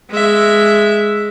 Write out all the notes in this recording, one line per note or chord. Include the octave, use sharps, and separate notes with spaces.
G#3 E5